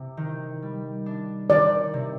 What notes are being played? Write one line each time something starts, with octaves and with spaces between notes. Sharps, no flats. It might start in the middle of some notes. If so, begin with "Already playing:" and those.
Already playing: C3
D#3
G3
D4
D#3 D5
C3